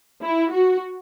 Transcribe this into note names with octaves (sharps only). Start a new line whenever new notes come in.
E4
F#4